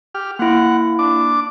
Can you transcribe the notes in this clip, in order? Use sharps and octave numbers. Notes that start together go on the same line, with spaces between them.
G4 F6
A#3 E4 F#5
D4 D6